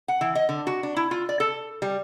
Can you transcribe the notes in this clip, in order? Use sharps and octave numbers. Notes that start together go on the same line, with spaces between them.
F#5
E3
D#5
D3
F#4
D4
E4
F4
D5
A4
G3